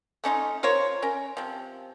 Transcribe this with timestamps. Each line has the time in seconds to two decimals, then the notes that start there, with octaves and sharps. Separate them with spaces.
0.24 A3 C#4 D#4 F4
0.63 F4 A#4 C5 C#5
1.02 C#4 A#4
1.37 C3 F3